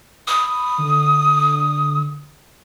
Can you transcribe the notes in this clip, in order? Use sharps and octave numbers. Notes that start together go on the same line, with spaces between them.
B5 D#6
D3